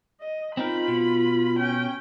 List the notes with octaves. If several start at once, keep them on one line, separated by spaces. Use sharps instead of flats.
D#5
C4 D#4 F4 A#4 B5
B2
C#4 G5